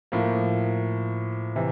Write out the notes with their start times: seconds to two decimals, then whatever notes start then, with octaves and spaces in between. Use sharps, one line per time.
0.12 A2 F3 A#3
1.56 C3 E3